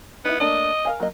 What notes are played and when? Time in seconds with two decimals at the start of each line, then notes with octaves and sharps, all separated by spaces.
0.25 B3 D#4 E4
0.40 A3 A#3 D4 D#5
0.85 A#4 F5 G#5
1.00 F#3 A#3 D#5